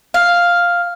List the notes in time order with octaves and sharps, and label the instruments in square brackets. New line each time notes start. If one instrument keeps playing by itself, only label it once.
[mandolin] F5